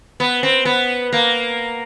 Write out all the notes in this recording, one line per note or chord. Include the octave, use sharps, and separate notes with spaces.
B3
C4
B3
A#3